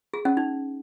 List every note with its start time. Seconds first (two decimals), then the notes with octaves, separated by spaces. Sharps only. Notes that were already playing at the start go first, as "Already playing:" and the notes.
0.14 G#4
0.25 C#4
0.37 D#4